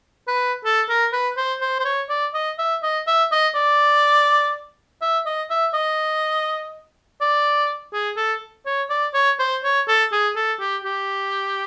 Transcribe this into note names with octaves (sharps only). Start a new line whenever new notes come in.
B4
A4
A#4
B4
C5
C5
C5
C#5
D5
D#5
E5
D#5
E5
D#5
D5
E5
D#5
E5
D#5
D5
G#4
A4
C#5
D5
C#5
C5
C#5
A4
G#4
A4
G4
G4